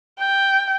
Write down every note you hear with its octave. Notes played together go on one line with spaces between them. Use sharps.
G5